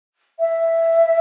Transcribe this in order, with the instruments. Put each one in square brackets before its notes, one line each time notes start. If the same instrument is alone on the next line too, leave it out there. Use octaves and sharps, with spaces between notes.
[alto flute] E5